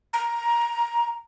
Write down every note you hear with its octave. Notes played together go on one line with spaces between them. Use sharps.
A#5